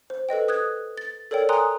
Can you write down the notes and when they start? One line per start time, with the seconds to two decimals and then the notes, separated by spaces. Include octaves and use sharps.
0.10 C5
0.29 A4 B4 D#5 G5
0.48 D#6 F#6 G#6
0.98 A6
1.31 A4 A#4 C#5 D5 G5
1.49 G5 G#5 A#5 C6 D#6 F#6